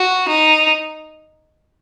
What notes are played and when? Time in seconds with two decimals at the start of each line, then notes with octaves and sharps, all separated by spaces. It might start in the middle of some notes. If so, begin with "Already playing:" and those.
Already playing: F#4
0.29 D#4